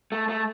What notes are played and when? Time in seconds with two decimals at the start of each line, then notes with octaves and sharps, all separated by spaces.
0.12 A3
0.29 A3